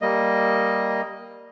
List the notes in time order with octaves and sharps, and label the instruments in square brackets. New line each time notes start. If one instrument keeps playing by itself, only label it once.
[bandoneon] G3 A#3 D#5